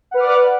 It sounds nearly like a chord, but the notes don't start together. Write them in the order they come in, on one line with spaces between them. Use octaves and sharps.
F#5 B4 F6 D6 D5